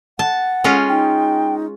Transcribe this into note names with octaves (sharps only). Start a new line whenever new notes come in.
F#5 A5
G#3 C#4 F4
D#4 G5